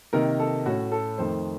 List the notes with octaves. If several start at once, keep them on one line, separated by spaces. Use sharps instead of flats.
C3 D#3 A#3 D#4 A#4
A4
A2 A3 C#4 F#4
A4
F2 D#3 A3 C5